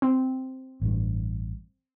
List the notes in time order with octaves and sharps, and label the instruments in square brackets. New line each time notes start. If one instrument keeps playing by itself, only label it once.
[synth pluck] C4
[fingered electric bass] A1 G2